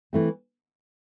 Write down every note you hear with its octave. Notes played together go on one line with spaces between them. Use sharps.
E3 A3 C4